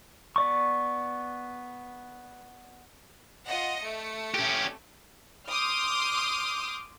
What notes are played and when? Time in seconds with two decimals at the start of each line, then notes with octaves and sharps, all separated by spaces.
0.36 B3 D5 C#6
3.45 F4 D#5 F#5
3.80 A3 C#7
4.34 C#4 G4
5.48 C6 D6 D#6 F6 G6